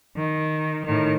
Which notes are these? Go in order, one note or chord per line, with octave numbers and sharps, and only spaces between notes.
D#3
A2 D#3